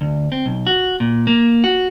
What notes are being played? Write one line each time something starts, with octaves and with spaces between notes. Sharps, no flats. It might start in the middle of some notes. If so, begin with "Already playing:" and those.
D2
C4
B1
F#4
A#2
A#3
F#4